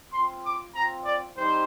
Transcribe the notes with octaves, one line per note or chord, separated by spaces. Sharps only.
C4 F4 C6
D6
C4 F4 A#5
D5
G3 C4 D#4 G4 C5